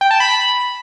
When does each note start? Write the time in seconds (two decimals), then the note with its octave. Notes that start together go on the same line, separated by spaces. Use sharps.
0.01 G5
0.11 A5
0.20 B5